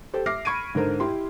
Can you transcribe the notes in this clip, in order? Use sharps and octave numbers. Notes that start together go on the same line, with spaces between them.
G4 A4 C5
E5 D6 F6 A#6 C7
B5 C#6 G#6 D7 D#7
G#2 D3 A#4 C5
E4 G4 C6